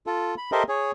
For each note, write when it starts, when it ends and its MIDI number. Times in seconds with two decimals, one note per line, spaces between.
0.07 0.35 65
0.07 0.35 69
0.38 0.51 83
0.52 0.63 67
0.52 0.63 69
0.52 0.63 70
0.52 0.63 72
0.52 0.63 75
0.52 0.63 76
0.69 0.92 68
0.69 0.92 73